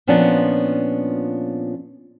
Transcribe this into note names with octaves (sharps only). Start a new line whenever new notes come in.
A#2 F3 B3 C#4 D4 F4